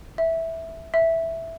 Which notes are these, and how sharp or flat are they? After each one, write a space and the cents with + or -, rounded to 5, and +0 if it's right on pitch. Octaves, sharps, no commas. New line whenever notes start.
E5 -5
E5 +0